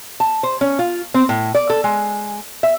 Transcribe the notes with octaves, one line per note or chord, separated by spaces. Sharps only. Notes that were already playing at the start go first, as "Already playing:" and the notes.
A5
C5
C#4
F4
C4
A2
D5
A4
G#3
E5